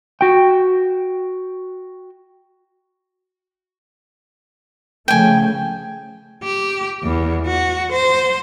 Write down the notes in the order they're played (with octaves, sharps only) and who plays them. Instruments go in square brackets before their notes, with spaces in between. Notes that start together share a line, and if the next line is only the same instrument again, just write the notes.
[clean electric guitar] F#4 G5
[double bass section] C#3 F3 A3 [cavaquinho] G5 G#5
[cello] G4
E2
F#4
C5